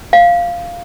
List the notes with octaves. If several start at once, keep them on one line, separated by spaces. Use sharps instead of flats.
F5